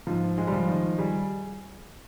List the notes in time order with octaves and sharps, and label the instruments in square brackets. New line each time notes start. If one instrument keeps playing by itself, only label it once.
[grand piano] G#2 [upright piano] F3
[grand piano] G#3
[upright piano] G3
F3
[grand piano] D#3
[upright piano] G3 [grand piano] G#4